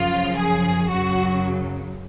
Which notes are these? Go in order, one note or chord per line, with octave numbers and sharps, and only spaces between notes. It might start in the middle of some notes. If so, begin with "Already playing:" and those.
Already playing: F#2 C#3 F3 F4
G#4
F#2 C#3 F#3 F#4